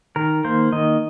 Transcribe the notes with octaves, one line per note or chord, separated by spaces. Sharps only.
D#3 A#4
A#3 C5
D#3 D#5